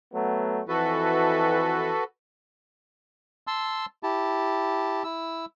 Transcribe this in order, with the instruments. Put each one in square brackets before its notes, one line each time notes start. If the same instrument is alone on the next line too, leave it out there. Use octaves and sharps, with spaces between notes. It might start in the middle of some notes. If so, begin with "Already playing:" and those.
[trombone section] F#3 A3 B3
[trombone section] F2 E3 [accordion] F#4 A4 B4
[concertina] A5 C6 E6
E4 G4 A5
E4 E6